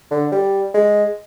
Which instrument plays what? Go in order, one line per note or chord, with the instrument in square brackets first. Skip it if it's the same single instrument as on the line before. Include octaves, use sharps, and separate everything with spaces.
[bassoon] D3
G3
G#3